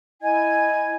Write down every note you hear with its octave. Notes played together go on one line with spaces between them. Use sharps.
E4 D#5 G#5 G#6